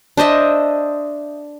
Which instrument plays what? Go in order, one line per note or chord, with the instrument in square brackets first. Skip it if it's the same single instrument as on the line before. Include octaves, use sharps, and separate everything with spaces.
[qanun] D4 C5 D#5 E5